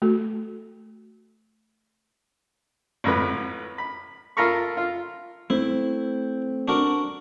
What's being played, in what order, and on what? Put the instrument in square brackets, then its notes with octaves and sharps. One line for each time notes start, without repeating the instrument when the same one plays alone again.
[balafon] A3 F#4 A4
[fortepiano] G#1 F2 A2 B4
B5
F4 A4 A#4 A#5 B5 C#6
F4
[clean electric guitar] A3 C4 [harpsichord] E4
[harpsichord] D4 F#4 A#4